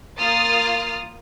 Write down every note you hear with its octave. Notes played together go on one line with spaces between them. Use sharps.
A#3 F4 D#6 F6 A6